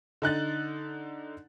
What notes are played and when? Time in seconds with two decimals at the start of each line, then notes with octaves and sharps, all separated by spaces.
0.22 D3 D#4 F#6 A6